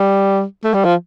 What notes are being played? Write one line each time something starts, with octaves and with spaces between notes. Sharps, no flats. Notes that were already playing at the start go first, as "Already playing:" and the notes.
Already playing: G3
A3
G3
F3